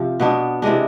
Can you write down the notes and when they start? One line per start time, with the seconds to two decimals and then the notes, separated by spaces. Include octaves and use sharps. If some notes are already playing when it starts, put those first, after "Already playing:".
Already playing: C3 F3 F4
0.20 B2 B3 D4
0.62 C3 E3 G#3 D4